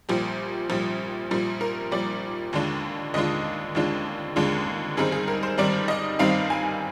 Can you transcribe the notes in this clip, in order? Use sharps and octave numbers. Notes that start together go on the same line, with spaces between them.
A#1 A#2 G3 G4
A#1 A#2 G3
A#1 A#2 G3
A#4
A#1 A#2 G3 D5
D#2 D3 G#3 D4 F4
D#2 D3 G#3 D4 F4 D#5
D#2 D3 G#3 D4 F4
D#2 D3 G#3 D4 F4
G2 D#3 G3 C4 D#4 G#4
G#4
A#4
C5
G2 D#3 G3 C4 D#4 D5
D#5
G2 D#3 G3 C4 D#4 F5
G#5